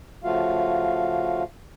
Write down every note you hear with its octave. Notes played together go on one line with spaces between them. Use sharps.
C#3 F3 A3 F4 F#4 F5